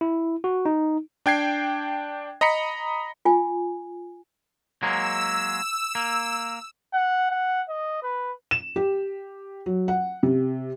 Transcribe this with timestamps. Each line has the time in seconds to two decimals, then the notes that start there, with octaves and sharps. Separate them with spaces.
0.01 E4
0.44 F#4
0.65 D#4
1.26 D4 G5 G#6 C7
2.41 D#5 A#5 B5 B6 C#7
3.25 F4 G#5
4.83 F#3 G#3 A#3 E6
5.95 A#3
6.93 F#5
7.31 F#5
7.68 D#5
8.02 B4
8.51 E7
8.76 G4
9.66 F#3
9.88 F#5
10.23 C3